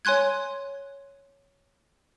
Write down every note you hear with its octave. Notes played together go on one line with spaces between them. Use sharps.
C#5 G#5 C6 F#6 G#6